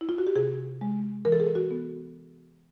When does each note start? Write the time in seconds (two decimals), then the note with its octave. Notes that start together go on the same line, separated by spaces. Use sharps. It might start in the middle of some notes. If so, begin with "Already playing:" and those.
0.01 E4
0.09 F4
0.18 F#4
0.27 G4
0.36 C3 G#4
0.81 G#3
1.25 E3 A#4
1.32 A4
1.40 G#4
1.47 A4
1.55 F#4
1.71 B3